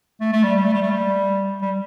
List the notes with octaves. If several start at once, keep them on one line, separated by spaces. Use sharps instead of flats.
A3
A3
G3
G3
A3
G3
A3
G3
G3